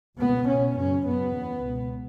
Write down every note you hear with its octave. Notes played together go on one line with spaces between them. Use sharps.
C#2 B2 B3
C#2 B2 C#4
F#2 C#3 C#4
F#2 C#3 B3
E2 C#3
C#2 B2